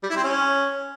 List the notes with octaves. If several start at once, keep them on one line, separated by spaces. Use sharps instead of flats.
G3
E4
C4
C#4